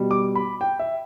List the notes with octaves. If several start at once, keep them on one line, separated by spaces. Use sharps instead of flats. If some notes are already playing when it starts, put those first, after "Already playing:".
Already playing: B2 G3
D6
B5
G5
E5